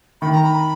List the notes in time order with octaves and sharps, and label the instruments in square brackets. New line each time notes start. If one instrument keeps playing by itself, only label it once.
[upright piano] D#3 [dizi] B5
[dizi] A#5
B5